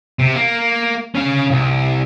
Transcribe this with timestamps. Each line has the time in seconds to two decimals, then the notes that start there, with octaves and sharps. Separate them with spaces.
0.19 C3
0.35 A#3
1.15 C#4 F5
1.51 C2